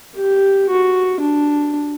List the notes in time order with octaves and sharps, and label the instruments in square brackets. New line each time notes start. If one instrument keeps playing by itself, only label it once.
[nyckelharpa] G4
F#4
D4